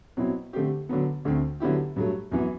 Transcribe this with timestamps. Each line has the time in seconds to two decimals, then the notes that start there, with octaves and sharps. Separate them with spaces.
0.17 B2 F#3 C4 E4
0.53 D3 A3 C4 G4
0.89 D3 F#3 B3
1.25 D2 D3 A3 C4
1.60 D3 F#3 B3 E4 G4
1.96 G2 F#3 A3
2.32 F#2 E3 B3